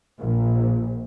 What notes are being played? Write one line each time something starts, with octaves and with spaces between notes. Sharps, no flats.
A#1